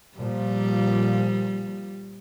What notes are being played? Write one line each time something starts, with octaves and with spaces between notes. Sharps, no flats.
A#2 F3 G3